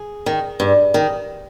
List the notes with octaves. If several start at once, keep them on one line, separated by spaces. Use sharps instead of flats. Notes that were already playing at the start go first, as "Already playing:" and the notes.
Already playing: G#4
D#3
G2
D#3